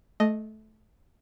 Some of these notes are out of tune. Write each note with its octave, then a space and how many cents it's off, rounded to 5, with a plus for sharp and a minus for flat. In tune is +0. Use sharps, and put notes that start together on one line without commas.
A3 -20 D#5 +0